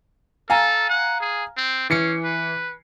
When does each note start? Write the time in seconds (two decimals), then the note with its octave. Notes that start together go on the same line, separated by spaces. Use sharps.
0.50 A4 F5 G#5 A#5
0.89 F#5
1.20 G#4
1.57 C4
1.90 E3 C#4 C7 C#7
2.24 B4